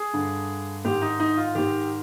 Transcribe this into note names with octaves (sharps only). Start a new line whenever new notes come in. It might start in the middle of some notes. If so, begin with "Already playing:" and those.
Already playing: G#4
G2 D3
G#2 D#3 G4
D#4
D#4
F4
G#2 D#3 G4